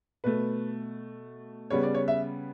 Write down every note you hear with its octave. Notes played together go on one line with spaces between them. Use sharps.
B2 A3 B4
C#3 G3 B3 C#5
D5
C#5
E5